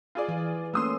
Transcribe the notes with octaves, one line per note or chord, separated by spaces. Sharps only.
F4 G#4 D5
E3
A3 A#3 C#4 C6 D#6 E6